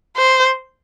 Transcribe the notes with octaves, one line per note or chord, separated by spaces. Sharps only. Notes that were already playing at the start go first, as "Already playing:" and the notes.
C5